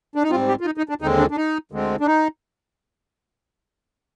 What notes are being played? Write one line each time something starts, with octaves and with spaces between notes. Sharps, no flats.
D4
D#4
G#2 G3 C4 F4
G4
F4
D#4
D#4
D4
D#2 D3 G#3 C4 D#4
D4
D4
D#4
D2 D3 G#3 C4
D4
D#4